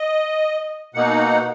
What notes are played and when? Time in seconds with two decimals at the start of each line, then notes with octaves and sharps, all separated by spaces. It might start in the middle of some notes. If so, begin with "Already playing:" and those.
Already playing: D#5
0.94 B2 A#3 D#4 F#5